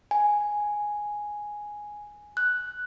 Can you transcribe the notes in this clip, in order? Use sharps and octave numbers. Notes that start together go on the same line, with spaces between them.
G#5
F#6